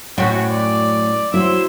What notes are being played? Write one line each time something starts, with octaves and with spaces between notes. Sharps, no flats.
F#2 A2 F#4 C#5 G5
D5
F#3 E4 C5 E6